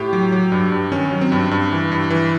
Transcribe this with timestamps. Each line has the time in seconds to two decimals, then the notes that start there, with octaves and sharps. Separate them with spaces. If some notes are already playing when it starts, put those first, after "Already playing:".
Already playing: A2 G4
0.13 F#3
0.32 F#3
0.52 G2
0.72 G2
0.92 D#3 C#4
1.11 F#3
1.21 C4
1.32 G2
1.51 G2
1.72 E3
1.92 G2
2.10 E3